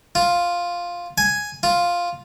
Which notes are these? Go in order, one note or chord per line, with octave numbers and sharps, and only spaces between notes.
F4
G#5
F4